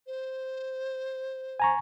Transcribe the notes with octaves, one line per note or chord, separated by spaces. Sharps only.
C5
G#5 A#5 C#6